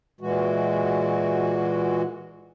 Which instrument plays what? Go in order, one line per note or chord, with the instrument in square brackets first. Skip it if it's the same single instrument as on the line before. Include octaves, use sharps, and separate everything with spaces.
[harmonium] A#2 E3 G#3 F#4